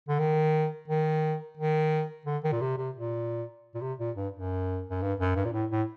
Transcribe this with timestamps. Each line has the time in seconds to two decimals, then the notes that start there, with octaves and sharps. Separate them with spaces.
0.09 D3
0.19 D#3
0.88 D#3
1.57 D#3
2.26 D3
2.44 D#3
2.52 A#2
2.61 C3
2.78 C3
2.95 A#2
3.75 A#2
3.81 C3
3.99 A#2
4.16 G2
4.33 F#2
4.90 F#2
5.02 G2
5.20 F#2
5.36 G2
5.45 A#2
5.53 A2
5.71 A2